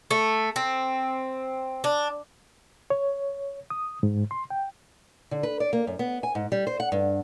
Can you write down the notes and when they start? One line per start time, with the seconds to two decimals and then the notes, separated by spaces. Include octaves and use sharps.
0.11 A3
0.56 C4
1.84 D4
2.90 C#5
3.70 D#6
4.03 G#2
4.31 C6
4.50 G5
5.31 D3
5.43 B4
5.60 D5
5.73 A#3
5.87 F#2
5.99 B3
6.23 G#5
6.35 G#2
6.52 G3
6.67 C5
6.80 F#5
6.92 G2